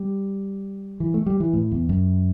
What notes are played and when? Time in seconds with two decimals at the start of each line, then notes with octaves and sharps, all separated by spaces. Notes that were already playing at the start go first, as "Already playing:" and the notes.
Already playing: G3
1.00 E3
1.14 A3
1.26 G3
1.40 E3
1.53 A2
1.72 E2
1.89 F#2